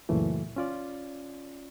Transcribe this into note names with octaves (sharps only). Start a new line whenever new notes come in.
C#2 F#2 A#2 C#3 E3 A3
C#4 F4 D5